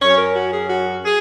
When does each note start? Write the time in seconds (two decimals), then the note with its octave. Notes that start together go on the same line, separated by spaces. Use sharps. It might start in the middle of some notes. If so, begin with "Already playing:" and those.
0.02 F#2 F#3 C#4 C#5
0.18 A#4
0.35 F#4
0.53 G#4
0.70 F#4
1.04 G#4